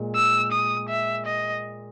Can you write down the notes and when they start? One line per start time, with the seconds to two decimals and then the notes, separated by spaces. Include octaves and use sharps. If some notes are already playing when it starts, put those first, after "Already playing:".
Already playing: A#2 G#3
0.15 E6
0.52 D#6
0.89 E5
1.26 D#5